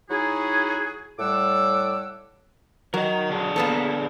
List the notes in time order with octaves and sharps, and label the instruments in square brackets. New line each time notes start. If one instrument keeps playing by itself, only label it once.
[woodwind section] F#3 D#4 E4 F#4 G#4
A2 G3 C#5 F#5 D6 E6
[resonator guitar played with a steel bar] F#3 [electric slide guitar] A#4 D#5
[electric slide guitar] D3 D4 G#4
[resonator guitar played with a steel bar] A#3 B3 A4